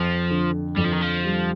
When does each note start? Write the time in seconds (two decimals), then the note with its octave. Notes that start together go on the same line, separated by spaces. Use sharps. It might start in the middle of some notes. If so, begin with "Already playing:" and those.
Already playing: F2 F3
0.31 D3
0.77 F2 G3
0.85 F3
0.93 D#3
1.02 F3
1.25 G3